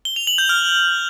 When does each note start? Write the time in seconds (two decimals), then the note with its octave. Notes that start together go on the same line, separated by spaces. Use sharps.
0.05 G7
0.16 F7
0.27 F#7
0.38 G6
0.49 F6